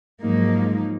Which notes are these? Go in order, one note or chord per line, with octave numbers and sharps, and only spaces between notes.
G#2 F3 F#3 A#3 D#4